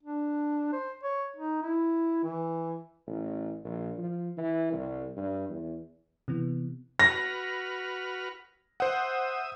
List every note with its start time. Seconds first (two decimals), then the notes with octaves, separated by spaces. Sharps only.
0.03 D4
0.73 C5
1.03 C#5
1.36 D#4
1.62 E4
2.23 E3
3.07 A1
3.65 A#1
3.98 F3
4.38 E3
4.72 C2
5.17 G2
5.49 E2
6.28 C3 E3 B3
6.99 F#4 B4 F6 A#6
8.80 C5 E5 F#5 D#6